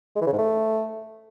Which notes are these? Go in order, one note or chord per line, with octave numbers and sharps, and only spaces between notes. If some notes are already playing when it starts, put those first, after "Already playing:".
G#3
E3
C#3
G#2
A3